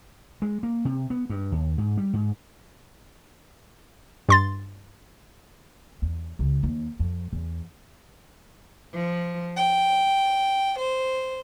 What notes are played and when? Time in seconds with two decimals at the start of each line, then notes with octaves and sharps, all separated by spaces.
0.42 G#3
0.63 A#3
0.85 C3
1.10 B3
1.30 G2
1.52 D#2
1.78 G#2
1.98 G3
2.13 G#2
4.29 G2 C6 A6
6.02 E2
6.39 C#2
6.63 D#2
6.99 F2
7.33 E2
8.94 F3
9.57 G5
10.78 C5